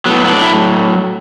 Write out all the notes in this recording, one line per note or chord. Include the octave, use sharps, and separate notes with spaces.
A2 F#3 B3
B3
D4
E4